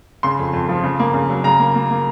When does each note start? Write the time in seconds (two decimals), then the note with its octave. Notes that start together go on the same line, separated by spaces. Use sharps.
0.23 C#3 C6
0.39 F2
0.53 F2
0.69 F3
0.84 C#3
1.00 A#3
1.14 C#3
1.30 F#3
1.44 C#3 A#5
1.59 A#3
1.75 A#3
1.90 A#3